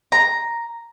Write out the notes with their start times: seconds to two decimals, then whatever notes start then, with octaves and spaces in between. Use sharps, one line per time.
0.12 A#5